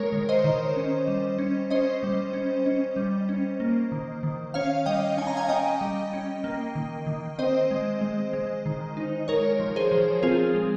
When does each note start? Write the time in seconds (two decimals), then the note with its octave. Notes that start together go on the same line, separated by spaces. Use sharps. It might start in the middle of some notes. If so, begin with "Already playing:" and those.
Already playing: G#3 A#4 C#5
0.13 D#3
0.29 C5 D#5
0.44 D#3
0.76 C#4
1.07 G3
1.38 C#4
1.71 C#4 C5 D#5
2.03 G3
2.33 C#4
2.66 C#4
2.96 G3
3.29 C#4
3.60 A#3
3.92 D#3
4.23 D#3
4.54 C#4 C#5 F5
4.86 G3 D#5 G5
5.17 C#4 G#5
5.27 A#5
5.37 F5 G#5
5.49 C#4 D#5 G5
5.81 G3
6.13 C#4
6.44 A#3
6.75 D#3
7.07 D#3
7.39 C4 C5 D#5
7.71 G#3
8.01 G#3
8.33 G#3
8.66 D#3
8.97 D#4
9.28 G#3 A#4 C#5
9.60 F3
9.76 G#4 C5
9.92 F3
10.23 C4 F4 G#4
10.55 G#3